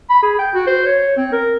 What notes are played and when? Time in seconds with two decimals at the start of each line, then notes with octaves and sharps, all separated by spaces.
0.09 B5
0.23 G#4
0.39 G5
0.54 F#4
0.67 C5
0.86 C#5
1.17 C4
1.32 A#4